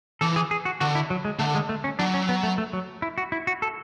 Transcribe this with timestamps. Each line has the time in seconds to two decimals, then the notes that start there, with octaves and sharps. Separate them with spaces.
0.21 E3 A4
0.36 G#4
0.51 G#4
0.65 F#4
0.80 D3 F#4
0.95 E4
1.10 F#3
1.25 G#3
1.39 D3 A3
1.55 G#3
1.69 A3
1.84 C#4
1.99 F#3 D4
2.14 C#4
2.29 B3
2.43 A3
2.58 A3
2.73 F#3
3.02 E4
3.18 F#4
3.32 E4
3.47 F#4
3.62 A4